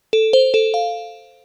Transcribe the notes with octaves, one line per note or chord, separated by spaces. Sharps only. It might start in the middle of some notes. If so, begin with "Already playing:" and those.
A4
C5
A4
F5